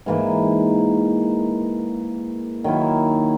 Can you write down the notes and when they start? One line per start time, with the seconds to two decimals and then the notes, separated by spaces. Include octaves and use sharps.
0.06 G#2 E3 A#3
2.64 D#3 F#3 A#3 E4